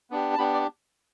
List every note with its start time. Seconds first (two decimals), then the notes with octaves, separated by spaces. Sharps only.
0.11 B3 D4 G4
0.34 A5
0.38 B3 D4 G4 B5
0.53 D5